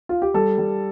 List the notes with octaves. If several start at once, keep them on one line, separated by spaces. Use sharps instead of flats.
F4
G4
G3 A4
G3